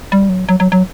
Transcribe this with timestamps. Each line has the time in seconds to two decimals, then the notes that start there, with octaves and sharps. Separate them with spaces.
0.12 G3
0.29 F#3
0.49 F#3
0.60 F#3
0.72 F#3